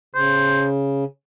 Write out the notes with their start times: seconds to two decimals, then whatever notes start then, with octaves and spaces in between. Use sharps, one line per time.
0.15 C#3 C5